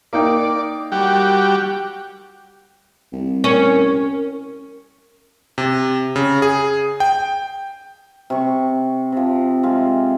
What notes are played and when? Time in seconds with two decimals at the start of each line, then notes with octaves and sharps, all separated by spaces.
0.13 A#3 D#4 D5 G5
0.92 G3 F#4 G4
3.13 C2
3.44 C#4 A#4
5.58 C3
6.16 C#3
6.42 G#4
7.00 G5
8.30 C3 C#6
9.12 C3 F3
9.63 G#3 F4 E5